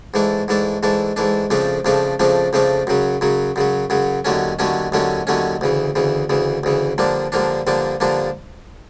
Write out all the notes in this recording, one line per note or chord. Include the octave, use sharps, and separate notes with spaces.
G#2 E3 A3 D4
G#2 E3 A3 D4
G#2 E3 A3 D4
G#2 E3 A3 D4
F2 C#3 F3 A3 D4
F2 C#3 F3 A3 D4
F2 C#3 F3 A3 D4
F2 C#3 F3 A3 D4
F#2 C#3 F#3
F#2 C#3 F#3
F#2 C#3 F#3
F#2 C#3 F#3
D#2 D3 F#3 A3 C#4
D#2 D3 F#3 A3 C#4
D#2 D3 F#3 A3 C#4
D#2 D3 F#3 A3 C#4
D2 C#3 E3
D2 C#3 E3
D2 C#3 E3
D2 C#3 E3
G2 D3 F3 A#3 D4
G2 D3 F3 A#3 D4
G2 D3 F3 A#3 D4
G2 D3 F3 A#3 D4